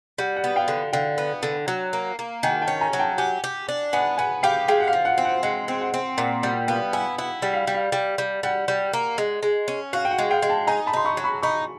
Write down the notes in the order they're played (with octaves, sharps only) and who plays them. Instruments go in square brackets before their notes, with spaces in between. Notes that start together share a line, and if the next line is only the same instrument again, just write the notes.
[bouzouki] G3 [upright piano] F#5
[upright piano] F#5
[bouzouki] B3
[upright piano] F5 G5
[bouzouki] D3
[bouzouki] D3 [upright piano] F5 G5
[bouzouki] B3
D3
F#3
A#3
A#3
[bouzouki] D#3 [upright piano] F#5 G#5
[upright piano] G5 A5
[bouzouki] C#4
[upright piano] G#5 A#5
[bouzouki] F#3
[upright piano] G5 A5
[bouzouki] G4 [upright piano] F#5 G#5
[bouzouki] G4
D4
[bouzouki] B3 [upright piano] F#5 G#5
[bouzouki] B3 [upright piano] F#5 G#5
[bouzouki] G4 [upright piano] F5 G5
[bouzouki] G#3 [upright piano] F5 G5
[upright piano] F#5
F5
[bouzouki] F3
[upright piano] F#5
[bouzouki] C4
[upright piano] F#5
[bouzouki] G#3 [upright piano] F#5
[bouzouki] C4
[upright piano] F#5
[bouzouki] C4
[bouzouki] A#2 [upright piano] F#5
[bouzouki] G3 [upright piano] F#5
[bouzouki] B3 [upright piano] F5 G5
[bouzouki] E4 [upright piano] F#5 G#5
[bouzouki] E4 [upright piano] F#5
[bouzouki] G3 [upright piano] F#5
[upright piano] F5
[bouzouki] G3
[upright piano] F5
[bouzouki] G3
G3
[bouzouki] G3 [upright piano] F#5
[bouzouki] G3
A#3
G#3
G#3
C#4
[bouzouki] F#4 [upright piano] F5
[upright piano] G5
F#5
[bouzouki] G#3
[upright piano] F5 G5
[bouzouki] G#3
[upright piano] G5 A5
[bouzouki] D#4 [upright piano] G#5 A#5
[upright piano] A5 B5
[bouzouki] D#4 [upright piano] C6
[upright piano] B5 C#6
[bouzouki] F#3
[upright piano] B5 C#6
[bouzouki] D#4 [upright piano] B5 C#6